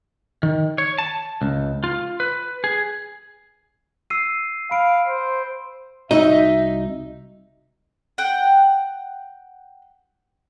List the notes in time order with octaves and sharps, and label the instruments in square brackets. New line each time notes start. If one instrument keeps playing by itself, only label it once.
[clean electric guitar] D#3
C#5
A5
C#2
F4
B4
G#4
[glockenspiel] E6 C7 D#7
[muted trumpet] F5 [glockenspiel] B5 D7
[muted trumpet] C5
[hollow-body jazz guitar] C2 F#4 D#5 [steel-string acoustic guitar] D#4 [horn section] E5
[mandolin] F#5 G5